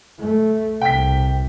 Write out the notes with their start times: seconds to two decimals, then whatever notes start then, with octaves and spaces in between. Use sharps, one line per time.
0.19 A3
0.81 C2 C3 G5 B6